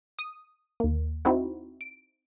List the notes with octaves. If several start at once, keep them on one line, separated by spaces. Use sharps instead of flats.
D#6
D#2 A#3
C4 D#4 E4 F#4
D7